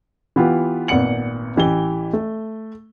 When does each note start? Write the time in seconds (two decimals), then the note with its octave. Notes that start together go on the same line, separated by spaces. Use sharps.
0.36 E3 B3 F4 G4
0.88 G#1 A#2 B3 F#5 C#7 F#7
1.56 A1 E3 G4 G7
2.13 A3